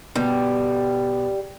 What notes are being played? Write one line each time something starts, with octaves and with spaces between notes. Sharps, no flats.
B2 G3